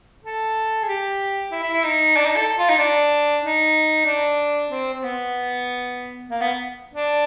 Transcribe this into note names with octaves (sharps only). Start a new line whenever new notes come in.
A4
G#4
G4
E4
E4
E4
D#4
D4
D#4
A4
F4
D#4
D4
D#4
D4
C4
C4
B3
A#3
B3
D4